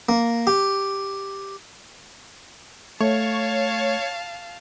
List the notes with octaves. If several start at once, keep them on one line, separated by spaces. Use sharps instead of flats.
A#3
G4
A3 C#5 F5 A5